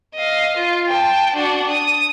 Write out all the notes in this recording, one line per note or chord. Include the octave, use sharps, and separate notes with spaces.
D#5 F5
F4
G5 A5
D4 F#4
D#6